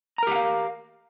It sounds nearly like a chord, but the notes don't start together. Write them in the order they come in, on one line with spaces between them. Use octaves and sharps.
A#5 A#4 G4 F#5 F5